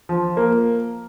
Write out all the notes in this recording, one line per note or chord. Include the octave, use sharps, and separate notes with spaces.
F3
A#3